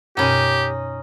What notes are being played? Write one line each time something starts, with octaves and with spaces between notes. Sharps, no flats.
F#2 B2 C#4 D#4 G4